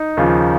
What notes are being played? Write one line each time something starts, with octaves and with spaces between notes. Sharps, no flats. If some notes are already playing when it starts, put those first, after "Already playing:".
Already playing: D#4
D#2 C#3 F3